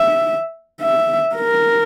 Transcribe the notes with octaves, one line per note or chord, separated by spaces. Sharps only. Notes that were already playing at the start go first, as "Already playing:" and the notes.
Already playing: E5
E5
A#4